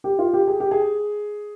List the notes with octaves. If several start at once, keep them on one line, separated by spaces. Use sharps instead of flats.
G4
F4
G4
G#4
G4
G#4